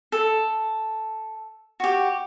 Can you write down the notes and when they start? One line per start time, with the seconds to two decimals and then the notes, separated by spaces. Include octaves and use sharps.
0.12 A4
1.80 F#4 G4